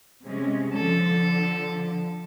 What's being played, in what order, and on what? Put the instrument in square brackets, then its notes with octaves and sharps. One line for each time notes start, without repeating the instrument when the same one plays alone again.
[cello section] C3 G#3 C#4
[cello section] D3 F3 [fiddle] A4